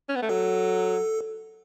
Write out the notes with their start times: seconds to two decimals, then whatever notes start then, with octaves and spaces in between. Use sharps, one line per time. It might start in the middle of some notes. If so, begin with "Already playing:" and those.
0.09 C#4
0.15 B3
0.22 A3
0.29 F#3 A4